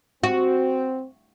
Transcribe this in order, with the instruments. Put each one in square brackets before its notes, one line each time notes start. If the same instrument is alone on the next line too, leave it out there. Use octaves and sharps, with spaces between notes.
[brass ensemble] C4 [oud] F#4